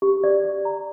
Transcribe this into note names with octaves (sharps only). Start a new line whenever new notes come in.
G4
D5
D5
A#5